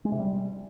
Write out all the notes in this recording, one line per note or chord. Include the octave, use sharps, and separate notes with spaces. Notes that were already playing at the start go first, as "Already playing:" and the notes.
G#3
C3
G3